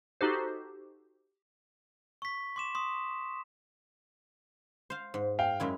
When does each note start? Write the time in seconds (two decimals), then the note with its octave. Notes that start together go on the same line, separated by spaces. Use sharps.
0.21 D#4 F#4 G4 A4 C5
2.22 C#6 B6
2.56 C6 D6 E7
2.75 C6 D#6
4.90 C5 F5
5.14 G#2
5.39 F5 G5
5.60 F#2 G#3 E4